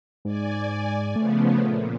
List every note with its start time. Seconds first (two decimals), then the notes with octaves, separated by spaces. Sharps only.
0.25 G#2 D5 G#5
1.16 C#3 F3 A3 B3
1.60 A#2